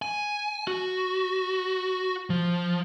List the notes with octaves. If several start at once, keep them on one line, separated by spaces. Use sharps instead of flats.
G#5
F#4
F3